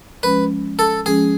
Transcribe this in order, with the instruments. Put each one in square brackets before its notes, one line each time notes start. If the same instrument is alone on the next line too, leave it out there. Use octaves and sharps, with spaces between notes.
[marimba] F3 G#3 C#4 [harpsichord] B4
[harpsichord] A4
[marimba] F3 G#3 C#4 [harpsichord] G#4